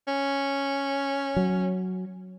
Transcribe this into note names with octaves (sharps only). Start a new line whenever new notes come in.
C#4
F#3